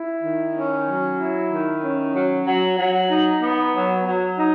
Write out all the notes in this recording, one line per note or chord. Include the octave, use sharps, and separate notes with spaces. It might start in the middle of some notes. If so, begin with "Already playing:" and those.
Already playing: E4
D#3
C#4
F#3
E4
D#3
C#4
F#3
F#3
F#3
D#4
B3
F#3
F#3
D#4